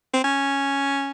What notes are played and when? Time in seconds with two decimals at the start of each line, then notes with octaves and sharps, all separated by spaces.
0.14 C4
0.24 C#4